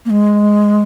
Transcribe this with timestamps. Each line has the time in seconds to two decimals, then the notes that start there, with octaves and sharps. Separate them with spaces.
0.05 A#3
0.10 G#3